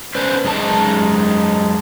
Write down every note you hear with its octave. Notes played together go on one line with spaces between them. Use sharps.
C#4 D4 B4 C5
F#2 G#3 D#4 A5